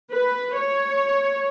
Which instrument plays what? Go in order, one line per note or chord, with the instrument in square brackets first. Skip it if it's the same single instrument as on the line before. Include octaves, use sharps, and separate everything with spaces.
[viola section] B4
C#5